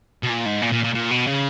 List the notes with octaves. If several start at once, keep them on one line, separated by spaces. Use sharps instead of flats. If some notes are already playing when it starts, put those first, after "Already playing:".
B2
A#2
G#2
A#2
A#2
A#2
A#2
B2
C#3